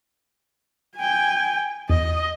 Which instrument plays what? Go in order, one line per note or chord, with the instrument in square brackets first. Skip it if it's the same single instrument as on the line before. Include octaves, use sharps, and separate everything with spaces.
[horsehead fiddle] G5 G#5
[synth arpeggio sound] E2 [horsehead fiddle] D#5